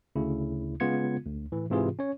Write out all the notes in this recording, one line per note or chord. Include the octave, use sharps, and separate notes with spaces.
D2 C#3 E4
C#3 G#3 B3 F4 G#6 C#7
D2
A2 E3
G#2 C3 E3 F4 G#4
C#4 C#5